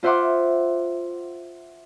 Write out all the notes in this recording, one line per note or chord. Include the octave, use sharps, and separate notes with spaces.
F4 C5 E5 F#5 C6 D6